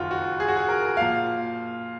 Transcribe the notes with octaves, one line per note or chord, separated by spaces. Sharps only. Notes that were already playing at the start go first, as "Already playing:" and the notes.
Already playing: F#1 F2 D#3 F4 F#4
F#4
G#4
F#4
G#4
A#4
A#2 F3 F5